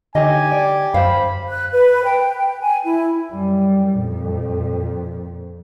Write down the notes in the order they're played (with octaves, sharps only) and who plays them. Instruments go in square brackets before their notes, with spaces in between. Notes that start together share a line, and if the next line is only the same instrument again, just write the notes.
[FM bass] D3 [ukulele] D#4 C#5 D#5 [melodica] G4 [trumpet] G#5
[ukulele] D5
[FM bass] F#2 [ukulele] C5 F5 [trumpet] B5
[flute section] F#6
B4
G5
G5
G#5
E4
[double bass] F#2 G3
F2 A#2